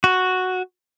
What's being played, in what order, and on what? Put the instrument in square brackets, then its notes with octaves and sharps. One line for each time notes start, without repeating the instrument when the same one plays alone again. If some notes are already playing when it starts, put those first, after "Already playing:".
[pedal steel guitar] F#4